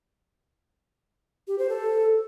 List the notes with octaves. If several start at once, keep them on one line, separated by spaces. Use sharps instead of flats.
G4
C5
A4